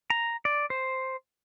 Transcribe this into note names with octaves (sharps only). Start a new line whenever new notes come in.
A#5
D5
C5